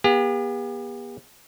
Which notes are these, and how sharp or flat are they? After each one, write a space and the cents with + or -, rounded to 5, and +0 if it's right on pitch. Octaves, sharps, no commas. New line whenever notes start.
B3 -45 G4 +45